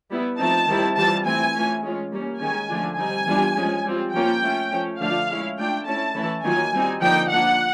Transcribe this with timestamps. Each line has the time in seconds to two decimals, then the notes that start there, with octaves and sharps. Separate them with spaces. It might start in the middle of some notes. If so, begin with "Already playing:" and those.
0.11 G3 B3 E4
0.39 F3 A3 C4 D#4 A5
0.68 D#3 G3 C4 E4
0.96 E3 G3 C4 F4 A5
1.26 E3 A3 C4 E4 G#5
1.54 E3 A3 C#4 F4
1.83 G#3 C#4 F4
2.12 G3 A#3 C#4
2.41 D#3 G#3 C#4 G#5
2.69 D3 F3 A3 D4 F4
2.98 G3 C4 D#4 G#5
3.27 E3 G3 B3 D4 F4
3.56 F3 G#3 C#4
3.85 G3 C4 F4
4.13 F3 A#3 C#4 F4 G5
4.43 A3 C#4 F4
4.72 F3 A3 C#4
5.00 D3 F3 A3 D4 F4 F5
5.30 G#3 C#4 E4
5.58 A3 D4 F4 G5
5.86 A3 C#4 E4 A5
6.15 E3 A3 C#4 E4
6.44 D#3 F#3 A#3 C#4 F4 G#5
6.73 G3 C4 D#4
7.02 D3 F3 A#3 D#4 G5
7.30 F3 A#3 D4 F4 F#5